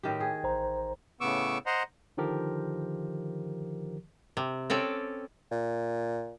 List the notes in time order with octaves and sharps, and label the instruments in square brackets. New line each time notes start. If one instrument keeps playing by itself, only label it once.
[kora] A2 D#3 G4
G#4
[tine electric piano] A1 C5 A#5
[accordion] A2 C#3 B3 C#6 D6 E6
C5 D#5 F#5 A#5 C6
[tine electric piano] D3 D#3 F3 G4 A#4
[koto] C3
C4 C#4 A4 D5
[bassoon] A#2